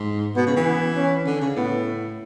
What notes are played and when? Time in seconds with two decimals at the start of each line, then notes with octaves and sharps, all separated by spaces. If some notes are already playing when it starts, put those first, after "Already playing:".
Already playing: G#2
0.36 B2 B3
0.47 C#3
0.56 E3
0.67 B3
0.96 C#4
1.27 D3
1.42 C#3
1.56 A2 B3